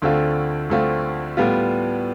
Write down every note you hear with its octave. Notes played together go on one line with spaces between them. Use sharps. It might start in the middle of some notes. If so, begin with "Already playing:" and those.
D2 D3 A3 C4 F4
D2 D3 A3 C4 F4
A2 G3 B3 F4